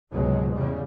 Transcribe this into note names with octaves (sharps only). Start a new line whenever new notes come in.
F1 C#2 G#2 B2 F#3 G#3
E2 C#3 G3